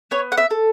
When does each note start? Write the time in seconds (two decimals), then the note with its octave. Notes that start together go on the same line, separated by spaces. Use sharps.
0.11 B3 C#5
0.32 F#5
0.37 E5
0.51 A4